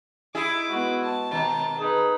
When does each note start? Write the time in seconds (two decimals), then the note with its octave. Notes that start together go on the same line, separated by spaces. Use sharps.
0.35 D#4 E4 G#4 D6
0.68 G#3 B3 F#4
1.03 A5
1.31 B2 D#3 A#5
1.79 D#4 G#4 B4